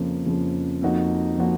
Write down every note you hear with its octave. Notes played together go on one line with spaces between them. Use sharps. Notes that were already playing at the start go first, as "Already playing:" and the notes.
Already playing: F2 C#3 F3 A#3
F2 C#3 F3 A#3
F2 F3 A#3 D#4 F#4
F3 A#3 D#4 F#4